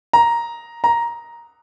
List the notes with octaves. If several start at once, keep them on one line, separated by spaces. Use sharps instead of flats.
A#5
A#5